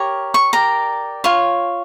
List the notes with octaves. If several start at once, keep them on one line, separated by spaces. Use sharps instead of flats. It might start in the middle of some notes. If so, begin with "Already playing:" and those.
Already playing: G4 A#4 C#5
C#6
G4 A#4 D5 A#5
F4 C#5